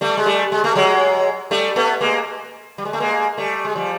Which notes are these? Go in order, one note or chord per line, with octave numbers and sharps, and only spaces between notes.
G3 A3
G#3
G3 A3
G#3
A3
F#3 G#3
G3 A3
A3 B3
G#3 A#3
G3
G#3
A3
G#3 A#3
G3 A3
G#3
F3 G3